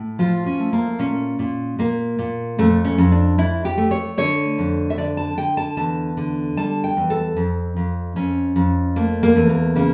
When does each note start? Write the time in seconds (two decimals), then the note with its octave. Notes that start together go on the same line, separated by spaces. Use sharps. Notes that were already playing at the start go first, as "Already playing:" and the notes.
Already playing: A2
0.19 F3 F4
0.46 C#4
0.59 A3
0.73 A#3
0.99 A#2 C#4
1.39 A#2
1.78 A#2 A#3
2.18 A#2
2.58 F2 A3
2.85 C#4
2.98 F2
3.12 D4
3.38 F2 E4
3.65 G4
3.77 A3
3.91 C#5
4.17 D3 C#5
4.58 F2
4.90 E5
4.97 D3 D5
5.17 A5
5.37 D3 G5
5.57 A5
5.77 E2 A5
6.17 D3
6.57 G3 A5
6.84 G5
6.97 E2
7.10 A4
7.36 F2
7.76 F2
8.16 F2 C#4
8.56 F2
8.96 A3 A#3
9.23 A#3
9.36 E2
9.49 A#3
9.75 C#3 A#3